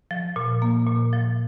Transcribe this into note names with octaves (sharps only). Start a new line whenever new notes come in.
F3
A#2
A#3
A#2
F3